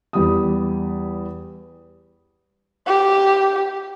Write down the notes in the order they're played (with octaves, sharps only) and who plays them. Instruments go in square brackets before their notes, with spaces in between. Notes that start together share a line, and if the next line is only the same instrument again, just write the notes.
[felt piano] E2 G3 D#6
[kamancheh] G4